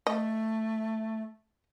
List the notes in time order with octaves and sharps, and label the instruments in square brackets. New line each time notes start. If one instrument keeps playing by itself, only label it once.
[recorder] A3 [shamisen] D#5